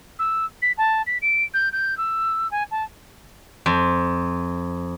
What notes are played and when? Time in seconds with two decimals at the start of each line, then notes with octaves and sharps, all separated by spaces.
0.19 E6
0.62 B6
0.78 A5
1.07 B6
1.22 D7
1.54 G6
1.73 G6
1.98 E6
2.51 G#5
2.71 A5
3.66 F2